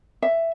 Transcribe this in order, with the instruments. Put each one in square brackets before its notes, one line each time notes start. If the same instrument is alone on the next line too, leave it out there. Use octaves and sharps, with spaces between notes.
[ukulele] E5